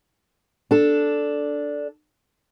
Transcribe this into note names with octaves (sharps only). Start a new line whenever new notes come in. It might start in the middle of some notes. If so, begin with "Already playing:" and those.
D4 A4